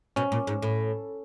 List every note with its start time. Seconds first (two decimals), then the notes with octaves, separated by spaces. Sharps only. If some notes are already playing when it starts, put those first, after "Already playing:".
0.16 B2 C#4
0.32 A#2
0.47 G#2
0.62 A2